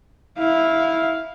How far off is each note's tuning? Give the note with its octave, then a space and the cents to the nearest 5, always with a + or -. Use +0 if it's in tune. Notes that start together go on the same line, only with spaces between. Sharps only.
E4 -10 F5 +0